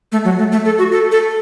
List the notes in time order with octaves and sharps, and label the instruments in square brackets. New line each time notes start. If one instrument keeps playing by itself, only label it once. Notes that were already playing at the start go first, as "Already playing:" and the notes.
[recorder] A3
F#3
A3
A3
A4
F#4
A4
A4